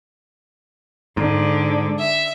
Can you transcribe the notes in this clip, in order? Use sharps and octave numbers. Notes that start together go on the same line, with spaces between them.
G#2 D3
E5